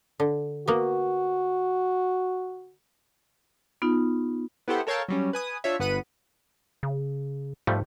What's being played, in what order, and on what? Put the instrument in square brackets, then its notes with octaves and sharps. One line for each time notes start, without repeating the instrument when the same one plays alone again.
[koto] D3
[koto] A#3 B3 [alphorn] F#4
[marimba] B3 D#4 F4
[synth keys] B3 E4 G4 A4 C5 F#5
A4 A#4 C#5 F5 G5 A5
F#3 G3 C#4
B4 G#5 D#6
D4 F4 C#5 E5
G1 B3 B4 F#5 B5 D#7
[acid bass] C#3
[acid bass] G#2 [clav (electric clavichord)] F3 G3 A3